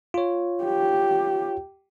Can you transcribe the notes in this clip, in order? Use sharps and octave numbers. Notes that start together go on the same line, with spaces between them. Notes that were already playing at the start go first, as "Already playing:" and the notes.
F4 C#5
G4